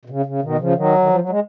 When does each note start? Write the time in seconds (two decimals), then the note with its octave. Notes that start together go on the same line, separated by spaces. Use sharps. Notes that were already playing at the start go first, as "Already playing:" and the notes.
0.05 B2
0.10 C#3
0.26 C#3
0.42 B2 D#3
0.59 C#3 F3
0.75 D#3 F#3
0.98 D#3
1.09 F3
1.20 F#3
1.29 G#3